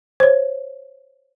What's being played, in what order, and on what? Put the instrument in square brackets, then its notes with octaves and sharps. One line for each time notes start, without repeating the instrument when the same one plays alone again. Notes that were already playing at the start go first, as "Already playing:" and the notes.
[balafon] C5 C#5